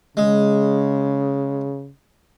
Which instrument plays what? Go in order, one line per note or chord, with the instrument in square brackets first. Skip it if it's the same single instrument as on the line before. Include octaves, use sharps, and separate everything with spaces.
[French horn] C#3 [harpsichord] G#3